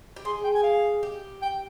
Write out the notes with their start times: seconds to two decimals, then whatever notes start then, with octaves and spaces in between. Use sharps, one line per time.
0.16 G4
0.25 G#4 C6
0.44 G5
0.55 G#5
0.63 F5
1.03 G4
1.42 G5